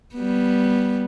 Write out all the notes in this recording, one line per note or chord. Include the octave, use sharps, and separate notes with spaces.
G3 B3